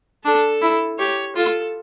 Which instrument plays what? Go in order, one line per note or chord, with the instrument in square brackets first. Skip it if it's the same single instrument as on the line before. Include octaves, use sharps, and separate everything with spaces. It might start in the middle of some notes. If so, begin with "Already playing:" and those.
[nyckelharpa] D4 [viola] A4
[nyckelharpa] E4
[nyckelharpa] G4 [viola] C#5
[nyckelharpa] F4 [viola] A4